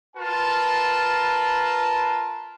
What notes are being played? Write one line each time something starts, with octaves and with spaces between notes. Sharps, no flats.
F4 A#4 B4 A5